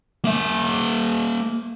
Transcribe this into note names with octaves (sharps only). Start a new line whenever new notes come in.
A#3 E5